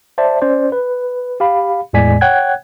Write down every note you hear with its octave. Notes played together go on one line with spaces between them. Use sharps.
C5 D5 E5 A5
C#4 C5 D5
B4
G4 F5 B5
E2 A2 G#3 D5 G#5 B6
C#5 F#5 G5 F#6 G#6